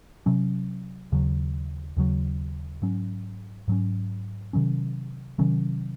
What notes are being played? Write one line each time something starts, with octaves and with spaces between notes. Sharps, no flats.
C3 F#3 C#4
D#2 C#3 F#3
D#2 C#3 F#3
G#2 F#3 C#4
G#2 F#3 C#4
C3 D#3 F#3 C#4
C3 D#3 F#3 C#4